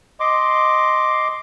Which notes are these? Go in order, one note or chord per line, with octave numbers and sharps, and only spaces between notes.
D#5 C6 D6